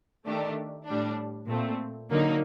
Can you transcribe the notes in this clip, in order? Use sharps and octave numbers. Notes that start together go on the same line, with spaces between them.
D#3 A3 D4 G4
A2 G3 D4
A#2 A3 C4
D3 F#3 A#3 D#4